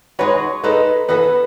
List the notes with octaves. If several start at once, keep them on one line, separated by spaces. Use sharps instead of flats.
G#3 D#4 F#4 B4 C#5
G#3 D#4 A4 B4
E3 B3 F#4 A4 B4